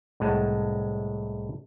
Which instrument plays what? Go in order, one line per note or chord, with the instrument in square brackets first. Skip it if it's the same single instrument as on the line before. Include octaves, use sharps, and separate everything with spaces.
[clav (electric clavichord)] C2 A2 G#3 F#5 A5